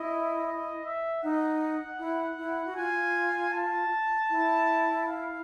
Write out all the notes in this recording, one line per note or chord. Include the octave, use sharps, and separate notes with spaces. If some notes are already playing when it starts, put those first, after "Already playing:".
Already playing: E4 D#5
D#5
E5
D#4 F#5
E4
E4
F#4
F4 G#5
A5
E4
F5